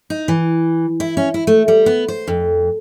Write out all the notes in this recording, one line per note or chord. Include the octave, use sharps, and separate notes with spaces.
D#4
E3
E4
C#4
E4
A3
G3
B3
C5
F2